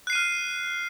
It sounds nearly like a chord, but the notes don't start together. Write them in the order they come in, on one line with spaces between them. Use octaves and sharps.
F#6 C7 D#7 F6